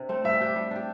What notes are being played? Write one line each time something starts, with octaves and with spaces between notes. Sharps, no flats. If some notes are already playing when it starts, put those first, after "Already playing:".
Already playing: C3 D4
A3 C4
G3 E5
D4 G4
G3
D4 G4